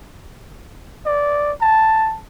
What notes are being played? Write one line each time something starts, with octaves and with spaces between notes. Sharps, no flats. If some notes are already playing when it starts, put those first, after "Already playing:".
D5
A5